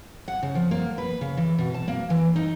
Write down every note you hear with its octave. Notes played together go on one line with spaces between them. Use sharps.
F#5
C#3
F3
A#3
B4
C#3
E3
B2
A5
A#3
E3
D#4